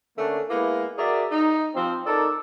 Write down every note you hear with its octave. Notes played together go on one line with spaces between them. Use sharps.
D3 A3 A#3 C#4 D4
G#3 A#3 B3 E4
F#4 G#4 A#4 D5 E5
D#4
F3 C4
D#4 A4 A#4 D5 A5